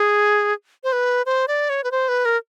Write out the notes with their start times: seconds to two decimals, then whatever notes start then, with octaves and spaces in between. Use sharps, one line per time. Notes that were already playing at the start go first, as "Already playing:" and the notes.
Already playing: G#4
0.84 C5
0.92 B4
1.26 C5
1.48 D5
1.70 C#5
1.84 B4
1.91 C5
2.09 B4
2.25 A#4